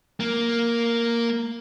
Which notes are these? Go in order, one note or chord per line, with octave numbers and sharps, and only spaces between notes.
A#3